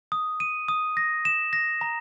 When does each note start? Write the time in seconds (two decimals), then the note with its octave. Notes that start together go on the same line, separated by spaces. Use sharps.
0.12 D#6
0.40 D#7
0.68 D#6
0.97 A#6
1.25 E7
1.53 A#6
1.81 A#5